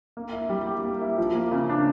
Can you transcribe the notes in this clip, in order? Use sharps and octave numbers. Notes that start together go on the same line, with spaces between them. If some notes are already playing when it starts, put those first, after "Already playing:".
A#3
E4
G3
G4
A#3
E4
F3
A#3
C#3
D4